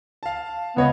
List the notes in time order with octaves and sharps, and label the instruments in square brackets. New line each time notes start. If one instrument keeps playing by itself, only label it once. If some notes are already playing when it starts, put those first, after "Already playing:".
[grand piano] F5 A5
[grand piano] C#2 C#5 D#5 [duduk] B3